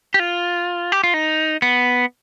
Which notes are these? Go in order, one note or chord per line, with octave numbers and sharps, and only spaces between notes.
G4
F4
G4
F4
D#4
B3